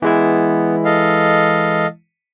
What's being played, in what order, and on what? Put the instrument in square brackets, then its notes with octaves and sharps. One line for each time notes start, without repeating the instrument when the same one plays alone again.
[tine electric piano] E3 G#3 E4 [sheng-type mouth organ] B3
[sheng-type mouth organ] A4 D#5 F5